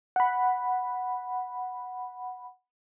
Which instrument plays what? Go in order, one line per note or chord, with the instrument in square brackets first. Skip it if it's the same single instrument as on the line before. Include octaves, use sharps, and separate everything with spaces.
[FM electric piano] F#5 B5